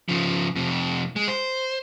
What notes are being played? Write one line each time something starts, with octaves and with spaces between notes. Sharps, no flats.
C#3 F3
F2 C3
G#3
C5